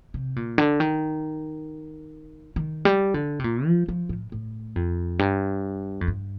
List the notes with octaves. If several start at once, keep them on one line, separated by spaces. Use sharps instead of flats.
C3
A#2
D3
D#3
D#3
G3
D3
C3
A#2
F3
F3
A2
A2
F2
G2
F2
G2